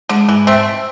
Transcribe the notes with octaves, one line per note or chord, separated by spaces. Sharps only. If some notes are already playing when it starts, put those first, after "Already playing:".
D3 G#3
G#2 E3
G#2 A3 C4